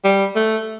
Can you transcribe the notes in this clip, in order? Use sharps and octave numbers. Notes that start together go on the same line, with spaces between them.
G3
A3